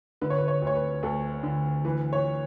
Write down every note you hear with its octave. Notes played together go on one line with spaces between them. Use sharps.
D3 B4
C#5
B4
C#5
D2
C#5
B4
D2 A4
D3
E3 B4
C#5